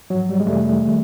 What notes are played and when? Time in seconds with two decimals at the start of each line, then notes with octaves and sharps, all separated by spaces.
0.10 G#2 F3 F#3
0.29 G3
0.40 G#3
0.47 F2 C3 E3 G3 A3
0.88 D#3